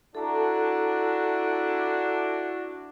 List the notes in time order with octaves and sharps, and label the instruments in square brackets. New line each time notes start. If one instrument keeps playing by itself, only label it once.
[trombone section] D4 E4 F#4 [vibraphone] A4 A5 A#5